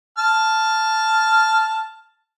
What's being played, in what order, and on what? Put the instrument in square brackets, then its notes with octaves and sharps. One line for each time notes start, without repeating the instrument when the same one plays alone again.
[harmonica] A5 F6